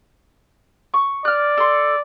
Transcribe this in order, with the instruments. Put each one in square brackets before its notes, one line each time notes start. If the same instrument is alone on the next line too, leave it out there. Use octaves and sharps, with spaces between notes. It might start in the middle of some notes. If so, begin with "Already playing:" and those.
[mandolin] C#6
[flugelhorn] D5 [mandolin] F6 F#6
[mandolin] A4 C6